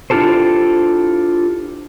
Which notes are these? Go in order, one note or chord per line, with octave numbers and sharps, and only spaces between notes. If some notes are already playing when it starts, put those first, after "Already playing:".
D4 E4 F4 G4 A4 C5